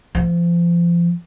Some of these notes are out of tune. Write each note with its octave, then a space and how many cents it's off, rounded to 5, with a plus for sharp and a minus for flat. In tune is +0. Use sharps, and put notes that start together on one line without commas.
F3 -30